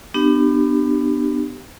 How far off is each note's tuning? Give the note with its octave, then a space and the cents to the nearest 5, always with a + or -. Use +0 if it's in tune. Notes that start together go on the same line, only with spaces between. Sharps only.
B3 +20 D4 +30 G4 -15